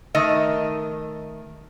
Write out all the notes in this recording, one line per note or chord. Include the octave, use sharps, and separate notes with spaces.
D#3 A3 D#5